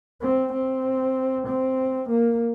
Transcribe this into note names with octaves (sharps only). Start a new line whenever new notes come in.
C4
C4
C4
A#3